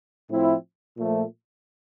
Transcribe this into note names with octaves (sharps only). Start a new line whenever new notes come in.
A2 F3 C4 E4
A#2 F3 A3